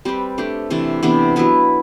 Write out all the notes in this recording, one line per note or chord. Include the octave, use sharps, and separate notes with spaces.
G3 C4 G4 B4
A3 D4 G4
C3 E3 A3 D4
C3 E3 B3 D4
F#3 B3 E4 B4